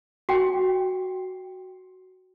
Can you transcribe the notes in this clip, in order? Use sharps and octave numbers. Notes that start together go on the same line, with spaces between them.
F#4 G5